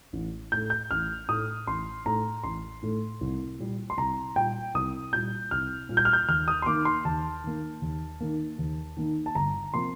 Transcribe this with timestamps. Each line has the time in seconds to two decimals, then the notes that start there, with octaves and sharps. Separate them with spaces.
0.13 A1
0.52 A2 A3 G6
0.70 G6
0.91 A1 F6
1.28 A2 A3 D#6
1.67 A1 C6
2.06 A2 A3 A#5
2.44 A1 C6
2.82 A2 A3
3.21 C2
3.59 A#2 G3
3.90 C6
3.97 C2 A#5
4.36 A#2 G3 G5
4.74 C2 D#6
5.12 A#2 G3 G6
5.51 C2 F6
5.89 A#2 G3
5.97 G6
6.05 F6
6.13 G6
6.28 D#2 F6
6.48 D#6
6.62 C6
6.66 D#3 A#3 D6
6.85 C6
7.05 D#2 A5
7.44 D#3 A#3
7.82 D#2
8.20 D#3 A#3
8.58 D#2
8.97 D#3 A#3
9.26 A5
9.35 G1 A#5
9.74 C3 F3 A#3 C6